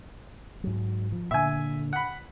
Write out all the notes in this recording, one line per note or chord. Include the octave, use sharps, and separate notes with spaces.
G#2 F#3
F3
A#2 D3 E5 G#5
F#5 B5